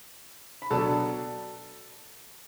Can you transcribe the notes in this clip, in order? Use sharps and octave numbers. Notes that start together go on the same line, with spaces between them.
B5
B2 F#3 B3 D4 A4 A5